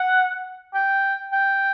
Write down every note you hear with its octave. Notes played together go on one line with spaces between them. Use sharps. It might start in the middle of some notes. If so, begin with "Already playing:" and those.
Already playing: F#5
G5
G5